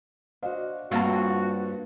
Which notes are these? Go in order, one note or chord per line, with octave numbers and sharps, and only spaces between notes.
D4 F#4 C5 D#5 F5
G2 A#3 C4 F4 F#4 C#5 F#5 A5